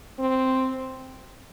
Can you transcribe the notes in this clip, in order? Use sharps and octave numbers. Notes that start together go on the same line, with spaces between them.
C4